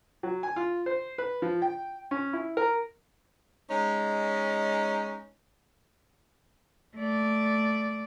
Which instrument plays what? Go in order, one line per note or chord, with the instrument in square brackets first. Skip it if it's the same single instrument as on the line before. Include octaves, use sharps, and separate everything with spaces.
[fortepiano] F#3
G#5
F4
C5
B4
F3
G5
C#4
E4
A#4
[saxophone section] G#3 C#4 D#4
[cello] A3 D5